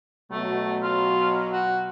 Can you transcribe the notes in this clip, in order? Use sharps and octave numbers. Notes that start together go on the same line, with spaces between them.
B2 F#3 A3
F4
F#4